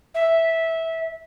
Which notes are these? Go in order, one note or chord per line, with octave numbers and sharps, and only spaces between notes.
E5